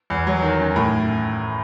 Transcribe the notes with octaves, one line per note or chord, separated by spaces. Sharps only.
E2
F#3
D#3
F#2
A2